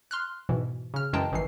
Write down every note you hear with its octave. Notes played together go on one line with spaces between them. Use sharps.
C6 F6 F#6
G#2 B2 E3
C#3 F6
F#2 E3 G#3 G5 A5 A#5
A1 D#3 E3 C7